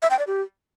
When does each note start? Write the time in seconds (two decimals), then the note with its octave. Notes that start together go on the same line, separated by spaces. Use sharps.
0.02 E5
0.11 G5
0.19 D5
0.27 G4